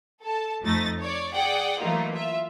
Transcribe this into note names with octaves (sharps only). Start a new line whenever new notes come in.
A4 A5
F2 F3 A3 D#4 A6 A#6
C#5 D5
G#4 D5 F#5 G5
E3 F#3 A3 A#3 D#4 F4
F4 E5